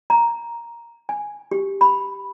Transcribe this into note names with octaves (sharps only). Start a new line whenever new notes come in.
A#5
G#5
G4
B5